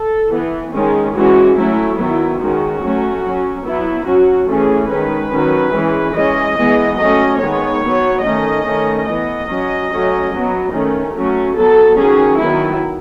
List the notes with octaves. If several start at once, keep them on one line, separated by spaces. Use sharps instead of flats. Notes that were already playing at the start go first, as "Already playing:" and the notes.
Already playing: A4
E3 B3
D#3 G#3 C#4
E3 G#3 C#4 F#4
F#3 A3 C#4 E4
D#3 F#3 B3 E4
D#3 G#3 C#4 F#4
F#3 A3 C#4
F#3 C#4
F#3 B3 E4
F#3 C#4 F#4
E3 A3 C#4 G#4
D#3 G#3 C#4 B4
D#3 F#3 C#4
E3 G#3 C#4
E3 G#3 C#4 D#5
E3 G#3 B3
F#3 A3 C#4 D#5
D#3 G#3 B3 C#5
F#3 B3
D#3 A3 C#4 D#5
D#3 A3 C#4
E3 B3 D#5
F#3 C#4
F#3 A3 C#4
F#3 B3
D#3 A3 C#4
F#3 A3 C#4
F#3 B3 A4
D#3 F#3 C#4 G#4
D#3 F#3 B3 E4